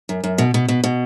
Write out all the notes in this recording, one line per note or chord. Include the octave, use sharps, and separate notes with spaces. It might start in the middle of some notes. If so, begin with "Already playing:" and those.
F#2
F#2
B2
B2
B2
B2